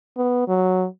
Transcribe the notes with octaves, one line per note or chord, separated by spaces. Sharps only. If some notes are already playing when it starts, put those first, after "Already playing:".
B3
F#3